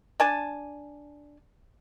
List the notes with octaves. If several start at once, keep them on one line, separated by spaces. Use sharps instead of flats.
D4 G#5 A5